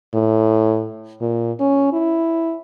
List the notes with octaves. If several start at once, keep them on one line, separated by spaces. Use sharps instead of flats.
A2
A#2
C#4
E4